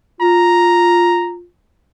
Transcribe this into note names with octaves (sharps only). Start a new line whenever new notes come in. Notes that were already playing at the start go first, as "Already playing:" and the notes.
F4 A#5